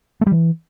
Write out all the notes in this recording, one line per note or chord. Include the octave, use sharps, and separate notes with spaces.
A3
G3
E3